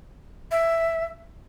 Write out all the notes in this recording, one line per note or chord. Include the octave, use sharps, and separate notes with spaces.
E5